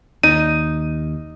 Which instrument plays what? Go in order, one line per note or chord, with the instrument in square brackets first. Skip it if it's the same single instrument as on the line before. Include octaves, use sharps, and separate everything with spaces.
[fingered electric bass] D#2 [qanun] D#4 [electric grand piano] D#7